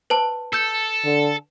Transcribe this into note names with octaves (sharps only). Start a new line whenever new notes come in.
B4 C5 A5
A4 E6 G6
D3